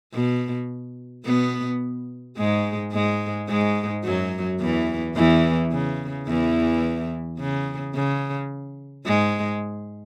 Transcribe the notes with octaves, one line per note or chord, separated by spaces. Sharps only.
B2
B2 B3
G#2 G#3
G#2 G#3
G#2 G#3
F#2 F#3
E2 E3
E2 E3
C#3
E2 E3
C#3
C#3
G#2 G#3